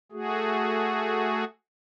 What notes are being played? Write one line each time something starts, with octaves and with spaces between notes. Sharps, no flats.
A3 F#4 G#4